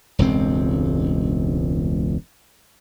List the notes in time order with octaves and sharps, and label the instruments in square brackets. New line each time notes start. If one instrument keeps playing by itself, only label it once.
[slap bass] E1 C#2 G2 C4